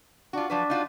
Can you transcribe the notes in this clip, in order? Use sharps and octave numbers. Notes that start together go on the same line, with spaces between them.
D4 F4 F#4
F3 F#3 D4 B4
D#4 F4 F#4